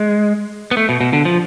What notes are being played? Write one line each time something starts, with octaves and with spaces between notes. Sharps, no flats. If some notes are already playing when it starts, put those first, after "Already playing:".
Already playing: G#3
B3
A3
B2
B2
D3
F3